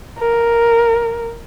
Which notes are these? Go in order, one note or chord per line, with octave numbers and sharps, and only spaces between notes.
A#4